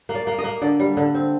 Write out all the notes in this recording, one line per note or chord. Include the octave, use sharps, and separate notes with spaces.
A#3
D5
A#3
D#5
A#3
D3 D5
G3
D3
C4